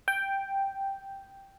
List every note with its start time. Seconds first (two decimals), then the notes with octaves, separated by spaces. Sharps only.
0.08 G5